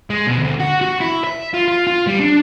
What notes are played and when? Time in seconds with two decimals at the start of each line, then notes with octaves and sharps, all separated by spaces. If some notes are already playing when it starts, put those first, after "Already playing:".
0.10 G#3
0.27 B2
0.39 D2
0.60 F#4
0.81 F#4
1.01 E4
1.24 E5
1.54 F4
1.68 F4
1.87 F4
2.07 G3
2.20 D4